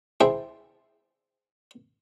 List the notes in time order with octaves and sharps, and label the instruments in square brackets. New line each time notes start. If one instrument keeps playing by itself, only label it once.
[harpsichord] E4 G#4 C5 E5 G5 A5